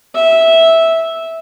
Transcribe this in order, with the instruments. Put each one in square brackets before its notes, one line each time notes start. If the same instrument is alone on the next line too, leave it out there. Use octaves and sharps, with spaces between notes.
[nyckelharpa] E5